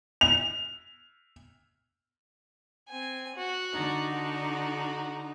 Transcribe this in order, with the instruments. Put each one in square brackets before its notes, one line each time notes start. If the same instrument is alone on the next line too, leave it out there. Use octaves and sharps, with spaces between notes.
[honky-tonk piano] F7
[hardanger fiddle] C4 G#5
F#4
[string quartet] D3 D#4
[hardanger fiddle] F#4